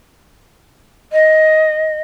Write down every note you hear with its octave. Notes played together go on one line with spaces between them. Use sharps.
D#5